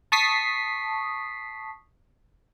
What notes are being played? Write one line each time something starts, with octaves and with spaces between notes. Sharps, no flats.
A5 C#6 D#6 B6 C7